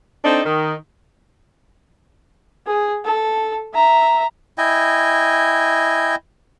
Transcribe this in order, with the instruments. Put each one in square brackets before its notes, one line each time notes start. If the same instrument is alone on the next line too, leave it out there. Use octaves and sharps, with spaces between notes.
[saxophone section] C4 D4 D#4 A4
D#3
[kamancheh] G#4
A4
E5 A#5
[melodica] E4 D#5 G5 G#5